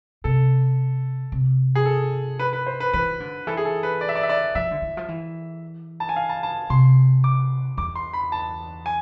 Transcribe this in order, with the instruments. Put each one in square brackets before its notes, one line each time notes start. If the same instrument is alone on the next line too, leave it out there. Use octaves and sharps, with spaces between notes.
[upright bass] C3 [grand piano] A4
[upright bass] C3
[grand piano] G#4
A4
B4
B4
C5
B4
[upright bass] E3 [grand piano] B4
[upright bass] D3
[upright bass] E3 [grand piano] A4
[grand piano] G#4
A4
B4
D5
E5
D5
E5
D5
[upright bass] F3 [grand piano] E5
[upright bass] D3
E3
F3
E3
[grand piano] A5
G#5
F5
A5
A5
[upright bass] C3 [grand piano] C6
[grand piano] D6
[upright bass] E2 [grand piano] D6
[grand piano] C6
B5
A5
G#5